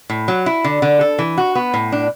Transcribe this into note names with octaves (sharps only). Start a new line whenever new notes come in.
A2
F#3
E4
D3
D3
A4
E3
F#4
B3
A2
D4